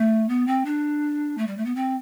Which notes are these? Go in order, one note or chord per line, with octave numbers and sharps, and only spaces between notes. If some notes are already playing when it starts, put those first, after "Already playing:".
Already playing: A3
B3
C4
D4
A3
G3
A3
B3
C4